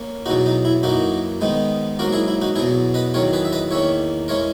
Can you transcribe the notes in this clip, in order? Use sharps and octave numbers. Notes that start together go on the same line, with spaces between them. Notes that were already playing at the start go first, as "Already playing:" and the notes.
Already playing: A#3 C#4
E2 B2 F#3 D#4 F#4
D#4
E4
F#2 E3 A#3 D#4 F#4
G#2 D#3 G#3 B3 D#4
G#2 F#3 A#3 F#4 A#4
E4 G#4
E4
D#4 F#4
E2 B2 F#3 B3 E4 G#4
B4 D#5
E2 D#3 F#3 A#4 C#5
G#4 B4
E5
B4 D#5
E2 D#3 A#3 C#4 C#5 E5
E3 G#3 C#4 A#4 C#5